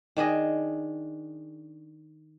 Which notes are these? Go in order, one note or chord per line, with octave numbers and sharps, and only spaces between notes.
D#3 D4 G#4 D#5